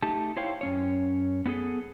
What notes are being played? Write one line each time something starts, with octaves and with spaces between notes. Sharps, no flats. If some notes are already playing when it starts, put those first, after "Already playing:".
A3 D#4 G4 A5
E4 C5 C#5 F5 G5
F#2 C#4 C#5
B3 C#4 F#4 G#4 A4